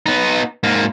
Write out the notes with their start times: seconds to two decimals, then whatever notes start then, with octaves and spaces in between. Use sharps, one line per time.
0.06 B3 D#4
0.63 G#2 A#3